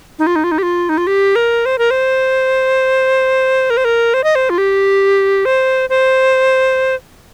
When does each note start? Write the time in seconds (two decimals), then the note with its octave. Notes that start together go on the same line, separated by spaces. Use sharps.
0.19 D#4
0.27 F4
0.36 D#4
0.44 F4
0.52 D#4
0.58 G4
0.63 F4
0.89 D#4
0.98 F4
1.07 G4
1.36 A#4
1.66 C5
1.78 A#4
1.91 C5
3.70 A#4
3.77 C5
3.85 A#4
4.14 C5
4.24 D#5
4.35 C5
4.50 F4
4.58 G4
5.45 C5
5.89 C5